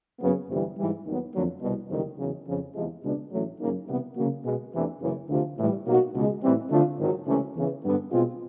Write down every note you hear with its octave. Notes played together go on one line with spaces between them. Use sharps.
F#2 C#3 F#3 B3
G1 F2 C3 E3 G3
G#2 E3 G3
D#2 D#3 F#3 B3
F2 D3 F#3 A#3
C2 B2 G3
F#1 F2 C3 D#3 G3
E2 C#3 F#3
F2 C#3 F3
E2 C3 F3 G#3
C#2 B2 G#3 B3 D4
A1 A2 F#3 A3
F#2 C#3 F#3 A#3 D#4
C3 E3 G3 B3
C#3 F#3 A#3
B2 G#3 B3
E2 C3 E3 A3 D4
F#1 F#2 C#3 E3
D2 C3 F3
A2 E3 G3
B2 F#3 A#3 D#4 F#4
C#2 B2 G#3
A2 E3 G3 C4
D3 F3 A3 D4 F4
G#1 G#2 D#3 F#3
C#2 C3 E3 A3 C#4
E2 C#3 E3
G2 D3 G3 B3
B2 G#3 C4 F4